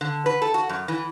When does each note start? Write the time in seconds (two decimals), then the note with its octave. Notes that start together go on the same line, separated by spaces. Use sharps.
0.01 D3
0.26 B4
0.42 A4
0.54 F#4
0.69 F#2
0.88 E3